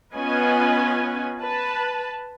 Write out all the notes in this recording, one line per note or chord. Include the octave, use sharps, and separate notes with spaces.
B3 C#4 F4 B4 D#5 G#5
B4 A5